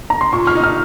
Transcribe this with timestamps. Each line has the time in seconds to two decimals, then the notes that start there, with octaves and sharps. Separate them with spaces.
0.10 A#5
0.21 C6
0.32 A#2 C#6
0.47 F6
0.55 D#4
0.63 F6